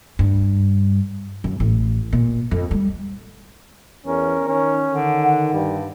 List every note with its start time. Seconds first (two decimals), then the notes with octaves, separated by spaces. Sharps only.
0.19 G2
1.44 F#2
1.60 A1
2.13 A#2
2.51 F2
2.71 G3
4.07 E2 C#4 A#4
4.48 D#3 C#4
4.91 D3 D#3
5.22 F#5
5.53 G2 G3